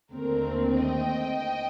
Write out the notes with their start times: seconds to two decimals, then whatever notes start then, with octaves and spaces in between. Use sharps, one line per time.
0.12 D#2 D3 A3 C4 A#4
0.79 D#5 G5